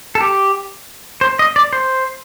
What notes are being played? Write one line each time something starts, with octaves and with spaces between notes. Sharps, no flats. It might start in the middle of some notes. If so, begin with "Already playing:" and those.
A4
G4
C5
D#5
D5
C5